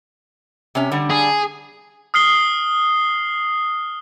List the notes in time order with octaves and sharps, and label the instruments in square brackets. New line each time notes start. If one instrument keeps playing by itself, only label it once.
[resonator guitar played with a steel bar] C3 C#4
D3 G3
[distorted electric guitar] G#4
[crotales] D#6 F6 C7 G7